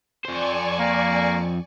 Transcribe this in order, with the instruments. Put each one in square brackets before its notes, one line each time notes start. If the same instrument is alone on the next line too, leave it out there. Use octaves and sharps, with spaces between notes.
[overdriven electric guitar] F2 C5 [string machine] D5 G#5 C#6
[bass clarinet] A#3